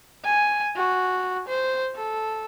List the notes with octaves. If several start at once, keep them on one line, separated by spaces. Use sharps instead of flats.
G#5
F#4
C5
A4